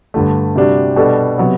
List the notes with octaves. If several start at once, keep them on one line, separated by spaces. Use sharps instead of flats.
G2 D3 A3
C3 G3 D4 F#4
B2 G3 D4 A4
C3 F#3 B3